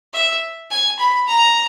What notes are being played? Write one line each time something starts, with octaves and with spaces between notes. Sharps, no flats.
E5
G#5
B5
A#5